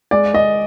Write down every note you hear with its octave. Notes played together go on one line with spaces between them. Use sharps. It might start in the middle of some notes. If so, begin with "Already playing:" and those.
G#3 D5
G#3 D#5